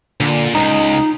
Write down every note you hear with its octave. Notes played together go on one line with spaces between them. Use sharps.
A#2 D3
C#2 G2 D#4